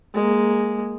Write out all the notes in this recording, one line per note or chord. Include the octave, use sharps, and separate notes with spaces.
G#3 A#3